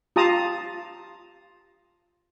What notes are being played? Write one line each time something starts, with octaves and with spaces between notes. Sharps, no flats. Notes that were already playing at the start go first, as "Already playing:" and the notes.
F4 G4 A5 A#5 D#6